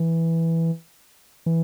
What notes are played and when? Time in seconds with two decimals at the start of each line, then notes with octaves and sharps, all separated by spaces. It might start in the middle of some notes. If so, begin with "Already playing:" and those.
Already playing: E3
1.46 E3